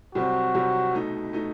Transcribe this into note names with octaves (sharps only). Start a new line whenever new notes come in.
C2 C3 F#3 C4 F#4
C2 C3 F#3 C4
B2 A3 D#4
B2 A3 D#4